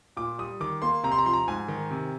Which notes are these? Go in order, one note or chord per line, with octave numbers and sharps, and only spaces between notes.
A#2 D6
G3 D#6
D#3 D6
A#3 C6
C3 A#5
C6
A#5
F3 C6
A#5
G#2 G#5
D#3
C3